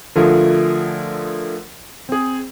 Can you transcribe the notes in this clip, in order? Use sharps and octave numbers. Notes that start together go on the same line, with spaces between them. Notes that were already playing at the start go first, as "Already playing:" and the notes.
D3 F3 A3 F4 G#4 A#4
C4 G#4